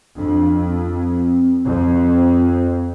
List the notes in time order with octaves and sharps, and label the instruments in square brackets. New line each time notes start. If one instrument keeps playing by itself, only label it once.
[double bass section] F2 [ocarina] D4
[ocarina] C4
[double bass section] F2